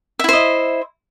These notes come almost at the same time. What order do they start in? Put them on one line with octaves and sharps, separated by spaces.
E5 E4 C5 D#5